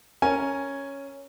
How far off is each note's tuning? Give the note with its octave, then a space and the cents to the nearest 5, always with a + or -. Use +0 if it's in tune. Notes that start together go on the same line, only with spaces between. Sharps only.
C#4 +0 A#4 +0 G#5 +0